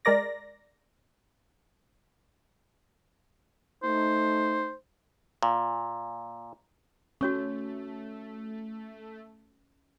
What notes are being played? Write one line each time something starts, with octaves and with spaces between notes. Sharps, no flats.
G#3 A#4 D5 A#6
A3 D#4 C5
A#2
A3 C#4 F#4 C#5 C#6